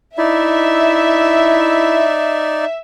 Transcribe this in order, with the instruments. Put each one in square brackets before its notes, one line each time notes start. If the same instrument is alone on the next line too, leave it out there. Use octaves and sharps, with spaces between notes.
[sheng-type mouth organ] D#4 D5 [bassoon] E4 [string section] E5